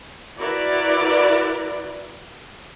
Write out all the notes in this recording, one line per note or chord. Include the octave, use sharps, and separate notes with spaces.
E4 F#4 A#4 B4 D5